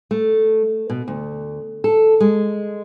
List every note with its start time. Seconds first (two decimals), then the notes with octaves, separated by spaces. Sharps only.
0.11 A3
0.90 B2
1.08 D2
1.84 A4
2.20 G#3